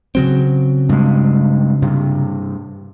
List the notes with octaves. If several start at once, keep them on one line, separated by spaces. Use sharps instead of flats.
C#3 F#3 C4
G2 G#3
G2 C3